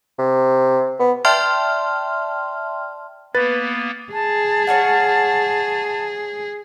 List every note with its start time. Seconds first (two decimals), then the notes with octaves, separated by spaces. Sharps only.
0.18 C3
0.99 B3
1.25 D5 E5 G5 A5 C6 F6
3.35 A#3 B3 B4 A6
4.13 G#4 A5
4.67 C#5 F5 F#5